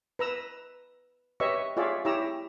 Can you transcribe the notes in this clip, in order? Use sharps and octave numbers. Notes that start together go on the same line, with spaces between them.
B4 A#5 E6
G4 B4 C#5 D#5 E5 C#6
F4 G4 G#4 C#5 D5 E5
E4 G4 C#5 A#5 E6